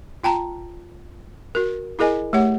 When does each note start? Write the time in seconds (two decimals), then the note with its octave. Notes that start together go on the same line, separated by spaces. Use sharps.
0.24 F4 G5 A5 A#5
1.55 F#4 A#4
1.99 E4 G#4 A#4 D#5 G#5
2.33 A3 G4 C#5 F#5